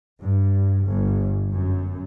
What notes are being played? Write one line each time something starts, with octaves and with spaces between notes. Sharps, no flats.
G2
G1
F#2